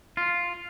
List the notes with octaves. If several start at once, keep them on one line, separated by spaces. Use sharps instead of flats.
F4